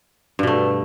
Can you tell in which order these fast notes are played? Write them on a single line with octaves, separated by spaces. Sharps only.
G2 B2 A3